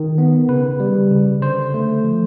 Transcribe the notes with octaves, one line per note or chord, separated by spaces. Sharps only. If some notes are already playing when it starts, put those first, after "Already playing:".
Already playing: D#3
B3
C#3 B4
G3
C#3
D3 C5
A3
F3